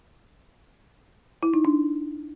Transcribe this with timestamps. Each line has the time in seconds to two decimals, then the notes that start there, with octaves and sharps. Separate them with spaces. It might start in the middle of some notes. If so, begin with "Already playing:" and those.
1.43 E4
1.54 D#4
1.65 D4